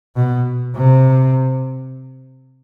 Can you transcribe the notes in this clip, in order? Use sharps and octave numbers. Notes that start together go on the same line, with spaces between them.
B2
C3